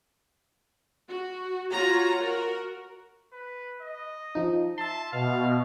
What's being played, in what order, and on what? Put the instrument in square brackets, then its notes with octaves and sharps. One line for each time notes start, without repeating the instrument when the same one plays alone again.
[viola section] F#4
F4 F#4 C#5 A#5
F#4 A#4
[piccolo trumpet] B4
D#5
[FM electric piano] F3 D#4
[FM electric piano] E5 C6 [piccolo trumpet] A5
[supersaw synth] B2 [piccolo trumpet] F5